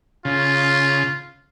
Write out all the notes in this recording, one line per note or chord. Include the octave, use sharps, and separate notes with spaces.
C#3 F4